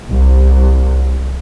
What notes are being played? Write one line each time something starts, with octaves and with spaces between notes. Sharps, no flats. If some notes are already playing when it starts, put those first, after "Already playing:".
C2